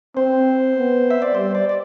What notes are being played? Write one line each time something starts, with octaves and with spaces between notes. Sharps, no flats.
C4 C5
B3
E5
D5
G3 C5
D5
D5